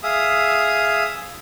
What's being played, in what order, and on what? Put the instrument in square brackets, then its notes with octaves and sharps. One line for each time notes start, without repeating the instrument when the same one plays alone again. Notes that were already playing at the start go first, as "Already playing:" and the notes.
[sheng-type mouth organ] G#4 E5 F5 D#6